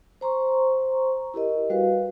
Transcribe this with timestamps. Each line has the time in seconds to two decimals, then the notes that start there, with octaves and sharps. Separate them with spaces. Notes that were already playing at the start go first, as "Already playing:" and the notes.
0.21 C5 A#5 C6 C#6
1.34 E4 G4 A#4 D#5
1.70 G3 F#4 B4 F5